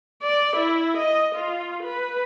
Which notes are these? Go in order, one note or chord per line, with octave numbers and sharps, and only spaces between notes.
D5
E4
D#5
F4
B4